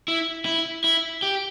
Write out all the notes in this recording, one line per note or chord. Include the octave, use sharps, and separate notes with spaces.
E4
E4
E4
G4